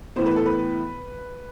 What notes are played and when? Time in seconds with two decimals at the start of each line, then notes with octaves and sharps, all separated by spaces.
0.16 A2 E3 B3 C5
0.26 B4
0.36 A4
0.46 B4